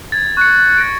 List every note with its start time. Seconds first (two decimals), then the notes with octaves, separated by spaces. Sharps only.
0.12 G#6 A6
0.37 C#6 F#6 C#7
0.78 A#6 D7